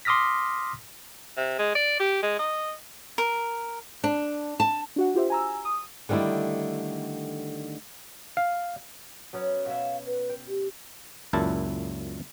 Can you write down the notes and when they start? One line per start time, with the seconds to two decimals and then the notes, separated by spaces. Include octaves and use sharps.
0.05 C6 D6 D#6 F6 A#6 B6
1.37 C3
1.59 G#3
1.75 D5
2.00 G4
2.23 G#3
2.39 D#5
3.18 A#4
4.04 D4
4.60 A5
4.96 D4 F#4 F#5
5.15 F4 G4 C5 E5
5.30 G#5 A#5 E6
5.65 D#6
6.09 D3 D#3 G3 A3 E4
8.37 F5
9.33 F#3 B3 C#4
9.66 B2 C#5 E5 F5
10.05 B4
10.29 G5
10.48 G4
11.33 C#2 F#2 A#2 E4 A5